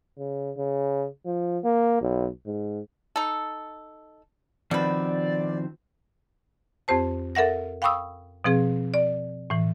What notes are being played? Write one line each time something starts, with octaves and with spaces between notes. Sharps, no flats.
C#3
C#3
F3
A#3
B1
G#2
D#4 A4
B2 D#3 F3 C4 B4 D5
F2 C4 G4 C5 A5
A4 A#4 E5 F#5 A#6
F5 G5 B5 C#6 D#6 E6
B2 F3 C4 G#4
D5
A2 E3